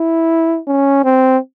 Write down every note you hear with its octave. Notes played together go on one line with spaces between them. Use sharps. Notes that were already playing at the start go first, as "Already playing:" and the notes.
Already playing: E4
C#4
C4